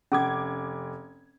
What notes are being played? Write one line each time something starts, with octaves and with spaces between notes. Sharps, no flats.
F1 C#4 D6 G#6